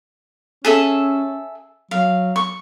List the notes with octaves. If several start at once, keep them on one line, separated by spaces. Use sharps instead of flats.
C#4 G#4 A4 E5
F#3 F5
C#6